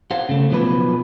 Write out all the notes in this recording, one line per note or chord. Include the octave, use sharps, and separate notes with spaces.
G4 C5 F5 F#5
C#3 A3
B1 B2 D#3 F3 G4 B4